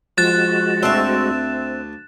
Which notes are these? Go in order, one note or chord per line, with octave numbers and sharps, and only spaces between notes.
F3 G#3 F#4 F#6 A6 E7
D2 C4 E5 F5 A5